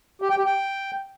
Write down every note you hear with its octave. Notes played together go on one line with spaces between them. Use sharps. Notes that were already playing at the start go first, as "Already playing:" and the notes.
G4
G5
G4
G5